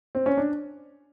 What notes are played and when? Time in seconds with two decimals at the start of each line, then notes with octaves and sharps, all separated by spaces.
0.15 C4
0.26 C#4
0.37 D4